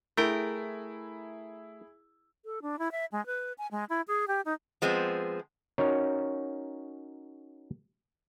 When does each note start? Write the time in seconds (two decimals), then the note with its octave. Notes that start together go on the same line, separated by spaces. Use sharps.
0.17 A3 E4 G#4 A#4 G5
2.45 A4
2.62 D4
2.79 E4
2.92 E5
3.12 G#3
3.26 B4
3.58 G#5
3.71 G#3
3.89 E4
4.08 G#4
4.28 G4
4.45 D#4
4.82 F3 G#3 B3 C4
5.78 C#4 D#4 F#4 A#4 C#5